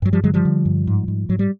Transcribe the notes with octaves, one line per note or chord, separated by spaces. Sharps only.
G2 F#3
F3 G3
D3 F#3 G#3
F3 G3
D3
G2
G#2
G#2
G#2 F#3
G3